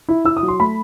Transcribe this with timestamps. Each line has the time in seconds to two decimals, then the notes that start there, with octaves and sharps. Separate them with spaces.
0.09 E4
0.25 E4 E6
0.37 D#6
0.43 F#3
0.48 C6
0.60 A3 B5